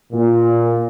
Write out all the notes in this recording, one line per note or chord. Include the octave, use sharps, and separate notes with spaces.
A#2